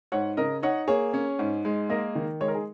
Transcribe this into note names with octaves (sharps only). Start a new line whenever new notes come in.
G#2 C#5 F#5
C#3 A#4 D#5
D#4 C#5 F#5
A#3 G#4 C#5
C#4
G#2
G#3
A#3 A#4 D#5
D#3
G#3 C#5
A#4
G#4